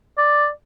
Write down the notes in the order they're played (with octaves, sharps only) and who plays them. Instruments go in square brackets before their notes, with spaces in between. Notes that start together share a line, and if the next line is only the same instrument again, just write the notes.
[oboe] D5